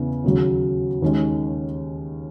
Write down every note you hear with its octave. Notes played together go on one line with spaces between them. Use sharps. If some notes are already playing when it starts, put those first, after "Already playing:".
Already playing: E2 C#3 E3 B3
D#2 C#3 F#3
D#2 D#3 G#3 C#4